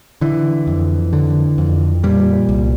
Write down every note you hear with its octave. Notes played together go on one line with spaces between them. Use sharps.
D3 E3
F2
D3
F2
A#2 G3
C2